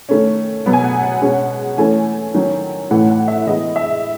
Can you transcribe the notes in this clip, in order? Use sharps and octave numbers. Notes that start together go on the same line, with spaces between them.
D#3 A3 C#4
B2 F#3 B3
G#5
F#5
F#5
B2 G#3 C#4
E3 A3 C#4 G#5
D#3 F#3 C#4
A2 E3 A3 C#4 F#5
F#5
E5
E3 G#3 B3 D#5
E5